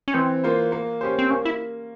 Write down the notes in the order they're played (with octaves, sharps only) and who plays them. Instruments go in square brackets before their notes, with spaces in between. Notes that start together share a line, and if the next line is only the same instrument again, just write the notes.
[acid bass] C#4
[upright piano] E3 [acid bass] C4
[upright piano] A#3 F4 C5
A#3
C#4 G4 C5
[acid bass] C4
[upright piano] A#3 [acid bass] C#4
[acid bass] E4